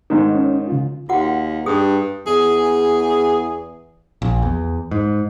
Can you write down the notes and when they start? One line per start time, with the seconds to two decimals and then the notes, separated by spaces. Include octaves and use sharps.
0.10 G#2 D#3
0.35 C#4
0.68 C#3 F4
1.09 D#2 F4 F#4 F#5
1.66 G2 G#4 D#6
2.27 E2 G#4
4.22 A#1
4.42 E2
4.91 G#2